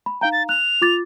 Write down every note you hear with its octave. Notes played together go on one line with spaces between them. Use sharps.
B5
D#4 F5 G5 A#5
A6
F#6 F7
F4 D6 A6